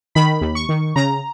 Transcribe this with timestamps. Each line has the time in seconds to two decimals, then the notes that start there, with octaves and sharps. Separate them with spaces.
0.15 D#3 B5
0.41 D#2
0.55 C#6
0.69 D#3
0.96 C#3 A#5